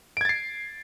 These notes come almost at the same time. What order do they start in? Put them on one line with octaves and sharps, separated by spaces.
D7 G#6 A6 C7